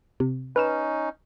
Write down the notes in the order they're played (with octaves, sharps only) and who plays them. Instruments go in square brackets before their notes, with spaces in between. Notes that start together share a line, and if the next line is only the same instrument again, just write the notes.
[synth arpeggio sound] C3
[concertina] C#4 D#4 [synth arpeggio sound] B4 F6 E7